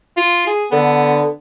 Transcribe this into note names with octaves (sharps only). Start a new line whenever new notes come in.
F4
G#4
D3 B3